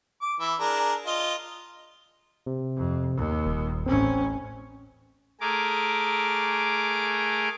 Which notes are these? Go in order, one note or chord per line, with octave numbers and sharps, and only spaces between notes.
D6
E3 E5
D4 G#4 A#4
F4 D#5
C3
F2
D#2
D#1
A1 C4 C#4
A3 G#4 A#4 D6